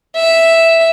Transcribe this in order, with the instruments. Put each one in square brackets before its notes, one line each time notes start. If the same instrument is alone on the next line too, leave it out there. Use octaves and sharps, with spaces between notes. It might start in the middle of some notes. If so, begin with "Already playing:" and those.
[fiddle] E5